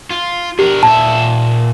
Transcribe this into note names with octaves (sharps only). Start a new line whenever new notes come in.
F4
D4 G4 A#4
A#2 E5 A5